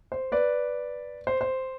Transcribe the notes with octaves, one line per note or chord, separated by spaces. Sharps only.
C5
B4 D5
C5
C5